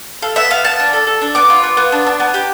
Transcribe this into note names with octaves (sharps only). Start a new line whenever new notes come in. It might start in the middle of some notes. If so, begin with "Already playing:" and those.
A4 F5
B3 E5
B3 F5
B3 A5
D4
A4
A4
D4
B3 D6
F4
B3
B3
D4
D4
B3
G4